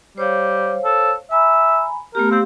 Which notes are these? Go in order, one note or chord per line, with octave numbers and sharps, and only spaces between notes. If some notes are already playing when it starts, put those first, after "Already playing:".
G3 C5 C#5 F5
A4
E5 G#5 A#5 B5
A3 B3 G4 A#4
C4 G4 F5